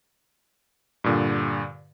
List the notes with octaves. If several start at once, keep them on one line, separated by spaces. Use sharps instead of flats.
G2 A#2 D3